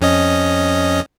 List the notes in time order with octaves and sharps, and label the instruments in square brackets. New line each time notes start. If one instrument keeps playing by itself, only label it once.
[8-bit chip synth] F2 C#4 D#5